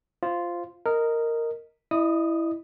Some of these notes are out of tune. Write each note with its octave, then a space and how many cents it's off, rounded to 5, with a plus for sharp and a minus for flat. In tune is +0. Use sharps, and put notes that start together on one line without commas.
F4 -5 C5 +0
A#4 -10 D#5 +0
E4 +0 D#5 -35 D#6 +0